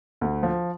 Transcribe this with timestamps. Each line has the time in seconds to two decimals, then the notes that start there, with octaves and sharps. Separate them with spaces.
0.21 D2
0.43 F3